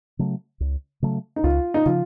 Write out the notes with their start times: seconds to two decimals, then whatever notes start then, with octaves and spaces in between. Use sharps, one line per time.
0.19 C#3 F#3 A3
0.60 C#2
1.02 C#3 F#3 A3
1.36 D#4
1.44 C#2 F4
1.74 D#4
1.86 C#3 F3 F4